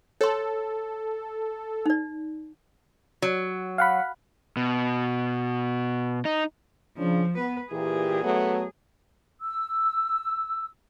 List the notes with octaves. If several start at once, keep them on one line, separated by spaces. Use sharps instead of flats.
A4 C#5 C6
D#4 D5
F#3
F5 F#5 B5
B2
D#4
C#3 F3 D4
B3 B4
A#2 E3 G4 G#4
F#3 A3 B3
E6